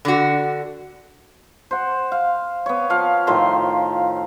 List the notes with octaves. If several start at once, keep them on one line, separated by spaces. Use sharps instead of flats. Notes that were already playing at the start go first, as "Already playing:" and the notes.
D3 F#4
C5 F#5
F5
B3 C#5
F3 F5
A2 D#3 F3 C6